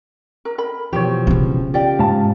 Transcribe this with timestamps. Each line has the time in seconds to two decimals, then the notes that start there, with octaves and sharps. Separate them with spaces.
0.45 A#4
0.58 A#4 B5
0.93 B2 E3 F3 G4 C#5
1.27 C#3 C#4
1.74 F4 G4 D5 G5
1.99 G#2 F5 A5